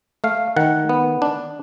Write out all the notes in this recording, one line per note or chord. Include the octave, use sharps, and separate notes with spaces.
A3 F5
D#3 F#5
B3
D4